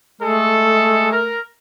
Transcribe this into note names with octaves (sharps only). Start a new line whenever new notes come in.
G#3 A3 G#4 A4
A#4